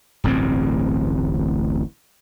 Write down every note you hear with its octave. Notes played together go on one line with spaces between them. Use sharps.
D1 A1 G2 C4